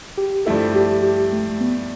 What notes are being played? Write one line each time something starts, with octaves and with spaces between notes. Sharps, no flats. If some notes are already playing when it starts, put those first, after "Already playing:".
G4
G2 F3 A3 E4 A4
G4
G4
A3
B3